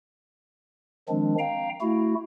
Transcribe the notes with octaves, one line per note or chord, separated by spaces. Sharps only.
D#3 F3 G#3 C4 D4
F5 G5 A#5
A3 E4 F#4